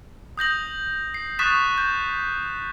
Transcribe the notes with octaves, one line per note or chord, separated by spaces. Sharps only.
D#6 G6 A#6 F#7
C7
C#6 D#6 F#6 A6 B6 E7
G6